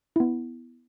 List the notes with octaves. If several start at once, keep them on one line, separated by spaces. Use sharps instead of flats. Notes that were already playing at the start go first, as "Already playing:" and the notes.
B3 E4